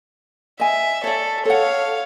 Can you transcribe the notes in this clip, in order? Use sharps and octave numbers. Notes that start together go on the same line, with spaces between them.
D#5 E5 G#5
A4 C#5 D5
A4 C#5 F5 F#5